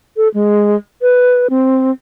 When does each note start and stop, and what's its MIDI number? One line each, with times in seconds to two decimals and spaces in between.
0.17 0.28 69
0.34 0.76 56
1.02 1.47 71
1.50 1.91 60